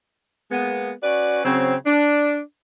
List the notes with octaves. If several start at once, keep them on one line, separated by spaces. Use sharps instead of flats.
G#3 A#3 B3
C#4 F#4 B4 D5
C#3 F#3 C4
D4